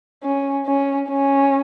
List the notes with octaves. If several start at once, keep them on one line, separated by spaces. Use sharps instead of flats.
C#4
C#4
C#4